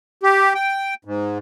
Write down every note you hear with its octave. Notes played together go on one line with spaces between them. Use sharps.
G4
G5
G#2